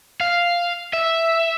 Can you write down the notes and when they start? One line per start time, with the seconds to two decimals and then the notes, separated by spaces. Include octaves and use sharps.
0.21 F5
0.93 E5